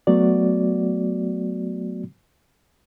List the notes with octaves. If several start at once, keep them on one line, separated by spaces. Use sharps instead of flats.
F#3 A3 B3 F#4 D5